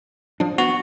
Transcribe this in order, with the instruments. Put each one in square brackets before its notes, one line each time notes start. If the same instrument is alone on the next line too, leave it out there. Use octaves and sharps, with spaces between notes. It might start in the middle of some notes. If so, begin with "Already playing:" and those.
[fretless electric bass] F3 D4
[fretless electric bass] B3 [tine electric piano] F#4